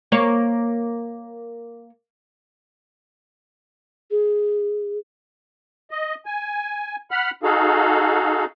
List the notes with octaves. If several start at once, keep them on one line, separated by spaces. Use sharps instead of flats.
A#3 C#5
G#4
D#5
G#5
F#5 B5 F6
D#4 F#4 G#4 A4 F5